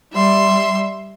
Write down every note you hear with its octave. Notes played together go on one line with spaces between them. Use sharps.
G3 E5 C6